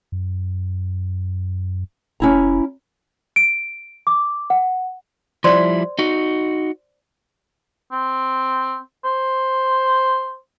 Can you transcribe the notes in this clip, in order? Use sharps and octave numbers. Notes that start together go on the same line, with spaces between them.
F#2
F1 C#4 E4 A#5
D7
D6
F#5
F3 G3 E4 C5 D5 C6
D#4 F#4
C4
C5